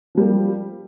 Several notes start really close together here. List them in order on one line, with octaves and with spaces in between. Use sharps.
F3 G3 A#3